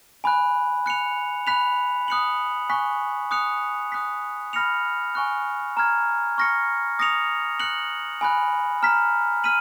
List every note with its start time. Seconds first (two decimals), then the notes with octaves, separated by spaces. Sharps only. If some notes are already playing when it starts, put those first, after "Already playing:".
0.24 G#5 B5 F#6
0.86 F#6 C#7 F7
1.47 B5 F#6 B6 F7
2.08 D#6 F#6 C#7 F#7
2.70 G#5 C#6 F#6 B6
3.31 D#6 F#6 C#7 F7
3.92 D#6 F#6 B6
4.53 B5 F6 A#6 C#7 F7
5.15 G#5 C#6 F#6
5.77 A#5 F6 G#6
6.38 C#6 F6 A#6 C#7
6.99 D#6 A#6 C#7 F7
7.60 F#6 C#7 F#7
8.21 G#5 B5 F#6
8.83 A#5 F6 B6
9.44 F6 B6 D#7 F#7